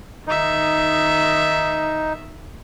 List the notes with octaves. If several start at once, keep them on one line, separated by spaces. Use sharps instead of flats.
D#3 D#4 E5